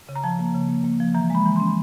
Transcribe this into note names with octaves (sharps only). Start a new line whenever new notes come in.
C#3
A#5
F3 A5
A#3
C#3
A#3
A#3
F3
E3 A#5
G#3 B5
E3
C#4 C6